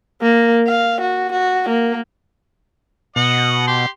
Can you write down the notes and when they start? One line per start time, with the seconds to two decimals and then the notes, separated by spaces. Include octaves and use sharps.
0.22 A#3
0.67 F5
1.01 F#4
1.32 F#4
1.69 A#3
3.16 B2 D#5 F#5
3.67 G4 C6